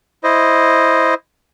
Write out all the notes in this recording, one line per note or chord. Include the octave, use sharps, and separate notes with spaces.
E4 C5 D#5